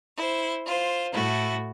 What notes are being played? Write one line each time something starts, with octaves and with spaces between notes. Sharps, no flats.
E4 C5
F4 C5
A2 A3 E4 F#4